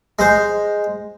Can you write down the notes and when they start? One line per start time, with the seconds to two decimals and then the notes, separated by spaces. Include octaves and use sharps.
0.19 G#3 C5